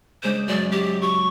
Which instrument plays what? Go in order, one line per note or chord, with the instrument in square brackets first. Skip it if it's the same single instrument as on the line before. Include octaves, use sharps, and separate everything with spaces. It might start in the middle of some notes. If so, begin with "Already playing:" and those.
[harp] C#3 G#3 D4 [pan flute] C5
[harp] F#2 F#3 G#3 [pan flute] D5
[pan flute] G4
C#6